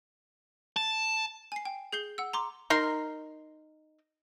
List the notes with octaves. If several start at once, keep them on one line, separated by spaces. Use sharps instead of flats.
A5
G#5 C7
G5
G#4 G6 C7 G7
F#5 E6
A#5 C6 D6
D#4 A#4 C6